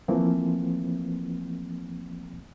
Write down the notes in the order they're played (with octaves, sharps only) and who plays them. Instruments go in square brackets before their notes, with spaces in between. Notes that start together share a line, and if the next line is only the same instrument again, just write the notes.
[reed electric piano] E3 F3 A3 A#3 C4